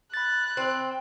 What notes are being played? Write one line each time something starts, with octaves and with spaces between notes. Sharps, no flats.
B5 F#6 A6
C4